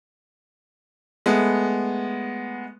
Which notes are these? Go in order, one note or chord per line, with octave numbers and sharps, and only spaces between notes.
G#3 A3 B3